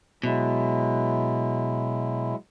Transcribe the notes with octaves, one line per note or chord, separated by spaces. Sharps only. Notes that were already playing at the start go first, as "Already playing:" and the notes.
B2 F#3 G#3 E4